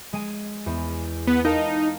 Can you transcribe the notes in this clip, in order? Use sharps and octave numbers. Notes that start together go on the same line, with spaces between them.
G#3 G#5
E2
B3
D#4 A#4 F5 A5